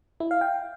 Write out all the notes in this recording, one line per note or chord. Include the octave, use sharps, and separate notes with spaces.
E4
F5
G5